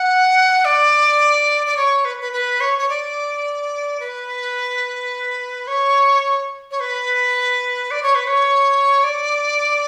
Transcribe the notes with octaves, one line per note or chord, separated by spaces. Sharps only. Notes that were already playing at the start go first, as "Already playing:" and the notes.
Already playing: F#5
D5
D5
C#5
B4
B4
B4
C#5
C#5
D5
B4
C#5
C#5
B4
D5
C#5
B4
C#5
D5